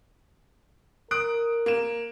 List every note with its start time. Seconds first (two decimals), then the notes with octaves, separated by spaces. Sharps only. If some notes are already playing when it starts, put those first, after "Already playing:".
1.11 A#4 D#6 F#6 D7
1.66 A#3 E7